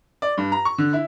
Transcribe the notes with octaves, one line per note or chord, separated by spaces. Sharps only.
D5
G2
A#5
C#6
D3
E4